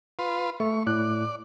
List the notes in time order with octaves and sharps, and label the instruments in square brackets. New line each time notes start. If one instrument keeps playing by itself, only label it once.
[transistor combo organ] F4 B4 C6
[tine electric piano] A3 [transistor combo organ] C#6
[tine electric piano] A2 F#6 [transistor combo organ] D5